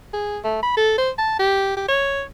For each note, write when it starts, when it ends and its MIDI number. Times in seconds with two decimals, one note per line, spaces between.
0.14 0.39 68
0.44 0.58 57
0.63 0.77 83
0.77 0.93 69
0.98 1.10 72
1.18 1.38 81
1.39 1.75 67
1.77 1.85 67
1.89 2.23 73